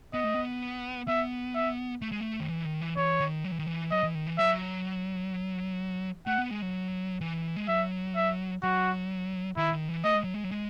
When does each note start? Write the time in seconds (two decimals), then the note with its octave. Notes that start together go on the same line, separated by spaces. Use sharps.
0.13 B3 D#5
0.24 A3
0.34 B3
1.08 B3 E5
1.55 E5
2.02 A3
2.12 G#3
2.20 A3
2.40 D#3
2.49 E3
2.65 D#3
2.81 E3
2.97 E3 C#5
3.20 D#3
3.44 F#3
3.52 E3
3.59 D#3
3.66 E3
3.91 F#3 D#5
4.03 E3
4.15 D#3
4.26 E3
4.38 F#3 E5
6.27 A3 F#5
6.38 B3
6.51 G#3
6.62 F#3
7.21 E3
7.56 G#3
7.68 F#3 E5
8.16 E5
8.63 F#3 F#4
9.57 D#3 E4
9.72 D#3
9.89 E3
10.04 A3 D#5
10.14 G#3
10.24 F#3
10.34 G#3
10.44 F#3
10.51 G#3